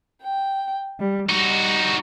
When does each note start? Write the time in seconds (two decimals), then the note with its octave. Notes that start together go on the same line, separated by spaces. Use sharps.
0.23 G5
1.00 G3
1.29 G3 D#4 F#4